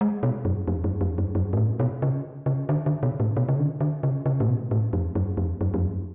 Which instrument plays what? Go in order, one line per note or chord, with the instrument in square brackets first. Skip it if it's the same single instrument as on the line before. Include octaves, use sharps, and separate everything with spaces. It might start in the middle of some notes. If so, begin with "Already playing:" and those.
[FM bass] G#3
B2
F#2
F2
F#2
F2
F#2
F#2
G#2
A2
B2
C#3
C#3
D3
D3
B2
A2
B2
C#3
D3
D3
C#3
C#3
A2
B2
A2
F2
F#2
F2
F#2
F2
F#2